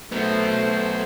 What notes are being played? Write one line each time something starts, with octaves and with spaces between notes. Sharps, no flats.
F#3 A3 B3 C5